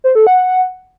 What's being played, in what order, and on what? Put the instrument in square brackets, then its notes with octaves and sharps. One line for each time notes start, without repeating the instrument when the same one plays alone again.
[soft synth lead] C5
A4
F#5